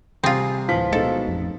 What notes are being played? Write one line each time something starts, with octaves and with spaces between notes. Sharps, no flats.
C3 G3 C4 F4 G#4
D1 E3 F3 B6
B2 G#3 D#4 A4
A1 F2